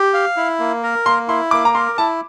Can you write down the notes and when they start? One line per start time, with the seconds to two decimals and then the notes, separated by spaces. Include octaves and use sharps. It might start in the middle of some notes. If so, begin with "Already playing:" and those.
Already playing: G4
0.14 F5
0.37 E4
0.59 A#3
0.83 A#4
1.06 A#3 C6
1.28 E4 C6
1.51 A#3 D6
1.65 A#5
1.74 A#4 C6
1.98 E4 A5